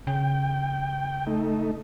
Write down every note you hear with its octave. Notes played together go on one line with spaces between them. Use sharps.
C#3 G5
A3 D#4